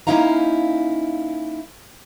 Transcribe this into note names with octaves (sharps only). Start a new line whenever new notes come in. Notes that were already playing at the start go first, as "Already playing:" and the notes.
A#3 C#4 D#4 E4 F5 A#5